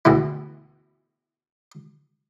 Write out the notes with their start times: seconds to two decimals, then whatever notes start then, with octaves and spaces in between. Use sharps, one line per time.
0.05 D2 B2 E3 E4